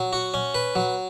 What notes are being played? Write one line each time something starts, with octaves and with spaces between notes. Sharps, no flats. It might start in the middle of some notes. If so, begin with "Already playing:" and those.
Already playing: F#3
F#4
C#4
B4
F#3